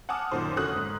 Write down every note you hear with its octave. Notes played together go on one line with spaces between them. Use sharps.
F#5 G#5 A5 D6 D#6 F6
F#2 A#2 D#3 C5
F1 D3 C#4 F#4 D#6 F#6
G#2